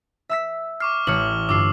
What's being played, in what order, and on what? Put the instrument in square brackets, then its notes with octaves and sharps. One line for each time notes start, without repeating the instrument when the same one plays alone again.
[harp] E5 E6 B6
[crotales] C#6 D6 F6 [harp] C7
[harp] A1 C#5 [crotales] F6 F#7
[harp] G2 D3 F4 [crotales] D6 E6 C7